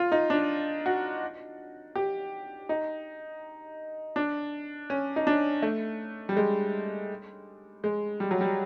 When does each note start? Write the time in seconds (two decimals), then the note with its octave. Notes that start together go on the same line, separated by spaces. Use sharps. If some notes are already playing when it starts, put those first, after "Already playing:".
Already playing: F4
0.12 D#4
0.30 D4
0.86 F#4
1.95 G4
2.69 D#4
4.16 D4
4.90 C#4
5.16 D#4
5.27 D4
5.62 A3
6.29 G3
6.37 G#3
7.84 G#3
8.20 G3
8.31 F#3
8.41 G3